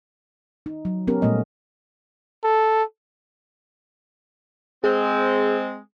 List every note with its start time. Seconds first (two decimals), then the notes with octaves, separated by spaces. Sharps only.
0.66 D#4
0.85 F#3
1.07 B3 C#4 G4 A#4
1.22 A#2 G3 A3 B3 D#5
2.44 A4
4.84 G#3 C4 G#4 C5